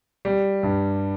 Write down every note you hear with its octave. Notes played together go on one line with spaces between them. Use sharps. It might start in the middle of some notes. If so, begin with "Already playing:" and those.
G3
G2